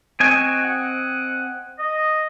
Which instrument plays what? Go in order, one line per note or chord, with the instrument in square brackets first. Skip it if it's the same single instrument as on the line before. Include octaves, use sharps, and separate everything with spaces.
[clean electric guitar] C4 D#5 G#5 [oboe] F#4
[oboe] F#5
D#5